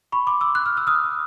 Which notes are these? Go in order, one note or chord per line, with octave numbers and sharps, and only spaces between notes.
B5 C#6
C6 D6
D6 E6
F#6
F6
E6
D#6 F6